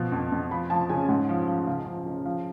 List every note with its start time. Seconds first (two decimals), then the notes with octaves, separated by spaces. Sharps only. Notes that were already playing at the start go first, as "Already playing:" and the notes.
Already playing: B2 F3
0.12 F2
0.32 F2
0.51 F3 B5
0.70 F3 A5
0.90 C#3 G#5
1.09 G#2 F#5
1.29 F3
1.48 F3
1.67 C#2 F5
1.86 F3
2.06 C#3
2.25 F3 F5